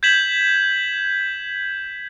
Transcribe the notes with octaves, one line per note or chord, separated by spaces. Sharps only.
G6 G#6 B6 E7 F#7